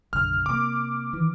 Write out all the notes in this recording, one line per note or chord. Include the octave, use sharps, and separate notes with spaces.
F#1 B1 D3 F6
C3 A#3 D6
D#3 E3